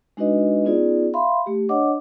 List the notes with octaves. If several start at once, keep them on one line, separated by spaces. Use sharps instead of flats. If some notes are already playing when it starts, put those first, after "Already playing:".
G#3 D4 D#4 F#4 B4 D#5
B3 C#4 D#4 F4 G#4 D5
E5 F5 B5 C6
A3 G4
D4 C#5 D#5 F#5 D6